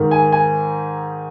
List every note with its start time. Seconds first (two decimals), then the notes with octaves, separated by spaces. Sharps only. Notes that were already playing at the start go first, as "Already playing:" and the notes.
Already playing: G#2 D#3
0.11 G#5
0.32 G#5